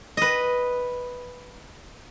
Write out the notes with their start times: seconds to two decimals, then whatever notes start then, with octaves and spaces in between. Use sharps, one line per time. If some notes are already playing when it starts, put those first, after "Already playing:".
0.17 B4 D#5